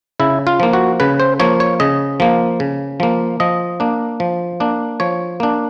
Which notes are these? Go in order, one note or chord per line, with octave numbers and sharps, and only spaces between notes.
C#3 E4
F4
F3 A#3
F#4
C#3 B4
C5
F3 A#3 C#5
C#5
C#3 D#5
F3 A#3
C#3
F3 A#3
F3 D#5
A#3 D4
F3
A#3 D4
F3 C#5
A#3 D4